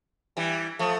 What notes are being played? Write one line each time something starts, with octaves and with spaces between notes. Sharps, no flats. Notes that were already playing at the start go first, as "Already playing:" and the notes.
E3 G3
F3 A3